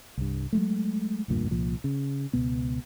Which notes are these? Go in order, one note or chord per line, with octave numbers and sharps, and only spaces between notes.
C2 G2
F#3 G#3 A3
F1 D2 G2 A#2
C2 A#2 F3
C#3
C#2 B2 B3